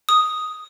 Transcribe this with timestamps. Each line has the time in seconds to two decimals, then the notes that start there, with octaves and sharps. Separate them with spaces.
0.09 D#6